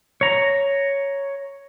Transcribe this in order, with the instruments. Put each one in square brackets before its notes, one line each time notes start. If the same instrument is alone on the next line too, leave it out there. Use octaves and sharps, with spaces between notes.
[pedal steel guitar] C#5 A#5